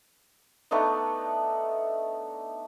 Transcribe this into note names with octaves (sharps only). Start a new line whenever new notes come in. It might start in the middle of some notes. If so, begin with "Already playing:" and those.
A3 B3 D4 D#4